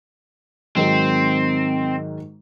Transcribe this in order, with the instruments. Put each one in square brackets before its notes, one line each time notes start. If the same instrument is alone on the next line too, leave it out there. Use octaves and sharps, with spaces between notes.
[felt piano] G#2 D#3 F#3 [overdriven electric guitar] C4